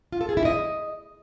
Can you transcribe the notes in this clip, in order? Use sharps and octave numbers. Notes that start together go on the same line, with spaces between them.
F4
A4
G#4
E4
D#5